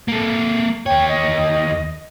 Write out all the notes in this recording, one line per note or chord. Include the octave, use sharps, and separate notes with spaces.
A#3 A4
D#2 C#5 G5
D#5